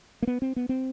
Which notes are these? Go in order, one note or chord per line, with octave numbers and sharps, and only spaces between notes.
A#3
B3
C4
B3
C4